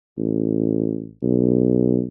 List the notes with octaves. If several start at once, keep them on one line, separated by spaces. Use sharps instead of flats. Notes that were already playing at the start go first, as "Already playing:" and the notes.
A1
B1